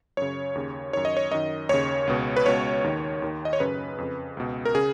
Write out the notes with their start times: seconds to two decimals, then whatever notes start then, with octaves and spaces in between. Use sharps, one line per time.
0.17 F#2 C#3 C#5
0.55 D#2 C#3
0.93 F#2 D#3 C#5
1.05 D#5
1.17 C#5
1.31 F#2 D#3 D#5
1.69 D#2 C#3 C#5
2.07 C#2 B2
2.36 B4
2.46 C#2 B2 C#5
2.84 D#2 D#3
3.22 D#2 D#3
3.45 D#5
3.53 C#5
3.60 F#2 C#3 B4
3.98 F2 C#3
4.37 C#2 B2
4.65 A#4
4.75 C#3 G#4